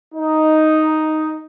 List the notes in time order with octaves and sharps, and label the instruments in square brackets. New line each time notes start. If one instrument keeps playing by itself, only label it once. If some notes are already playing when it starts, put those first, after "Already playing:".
[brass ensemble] D#4